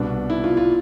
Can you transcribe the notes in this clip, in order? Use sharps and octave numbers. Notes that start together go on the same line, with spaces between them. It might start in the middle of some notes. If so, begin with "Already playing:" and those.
Already playing: C2 B2 B3 D4
E4
F4
F4